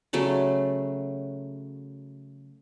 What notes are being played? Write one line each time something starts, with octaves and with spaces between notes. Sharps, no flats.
C#3 F#3 A3 D5